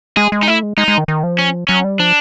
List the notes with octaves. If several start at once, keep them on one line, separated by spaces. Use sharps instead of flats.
G#3 G#4
G#3
D#4
A3 E4
G#3
G#3 D#4
G#3
D#3
D#3
F3
C#4
F#3 C#4
G3
F3 D4